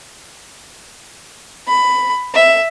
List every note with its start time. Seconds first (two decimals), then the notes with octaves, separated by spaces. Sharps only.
1.68 B5
2.34 E5